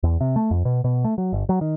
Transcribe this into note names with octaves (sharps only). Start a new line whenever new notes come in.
E2
C3
A3
F2
B2
B2
A3
F#3
G1
F#3
D#3